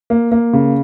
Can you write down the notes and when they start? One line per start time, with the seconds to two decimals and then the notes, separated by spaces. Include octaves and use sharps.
0.10 A#3
0.32 A#3
0.53 C#3